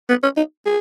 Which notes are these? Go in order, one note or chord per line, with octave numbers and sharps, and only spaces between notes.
B3
C#4
D#4
G#4